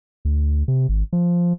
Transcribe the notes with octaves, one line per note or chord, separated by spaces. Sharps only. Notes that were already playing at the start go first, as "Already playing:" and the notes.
D2
C3
G#1
F3